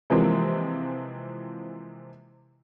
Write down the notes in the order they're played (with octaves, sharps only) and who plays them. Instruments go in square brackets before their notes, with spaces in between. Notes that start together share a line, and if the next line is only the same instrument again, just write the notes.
[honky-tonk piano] C3 E3 F3 G#3 A#3 C4